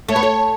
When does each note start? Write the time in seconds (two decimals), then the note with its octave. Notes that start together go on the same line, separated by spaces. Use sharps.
0.08 A3 C#5
0.16 B3
0.23 A3